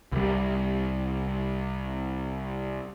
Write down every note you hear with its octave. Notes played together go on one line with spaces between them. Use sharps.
C2 G3